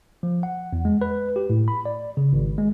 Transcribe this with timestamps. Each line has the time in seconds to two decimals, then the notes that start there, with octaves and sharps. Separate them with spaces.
0.23 F3
0.43 F#5
0.73 E2
0.85 G#3
1.01 B4
1.36 G4
1.50 A2
1.68 B5
1.85 D5
2.17 C#3
2.33 G#1
2.58 G#3